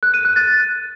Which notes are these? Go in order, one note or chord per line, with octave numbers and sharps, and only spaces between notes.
F#6
D#7
F#6
A6